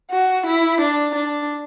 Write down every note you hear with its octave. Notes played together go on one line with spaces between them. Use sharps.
F#4
E4
D4
D4